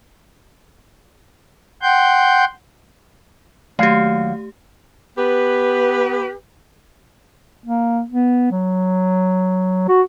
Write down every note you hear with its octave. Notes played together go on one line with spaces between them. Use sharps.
F#5 G5 C6 G6
D#2 F#3 A3 G4 F5
B3 G4 B4
A#3
B3
F#3
F#4